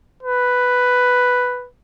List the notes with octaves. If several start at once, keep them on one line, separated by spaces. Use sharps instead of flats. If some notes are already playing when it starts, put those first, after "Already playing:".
B4